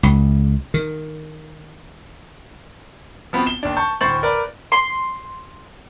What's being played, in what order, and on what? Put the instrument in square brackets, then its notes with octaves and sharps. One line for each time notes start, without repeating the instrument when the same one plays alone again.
[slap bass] C#2
D#3
[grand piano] F3 B3 C4 F#4
E7 G7
D#2 D4
A5 C#6 G6
D2 A2 C5 C#6 A6 F#7
A#4 B4 D5
[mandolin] C6